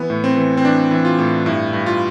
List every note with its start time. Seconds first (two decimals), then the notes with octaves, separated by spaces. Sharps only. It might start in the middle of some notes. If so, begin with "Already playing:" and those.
Already playing: E3 B3
0.10 A2
0.24 C4
0.37 E3
0.57 C4
0.64 E3 D4
0.91 E3
1.05 F4
1.19 A2
1.46 G2 E4
1.73 G2
1.86 F4